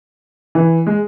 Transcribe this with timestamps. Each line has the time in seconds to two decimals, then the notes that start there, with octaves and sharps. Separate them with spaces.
0.55 E3
0.87 G#3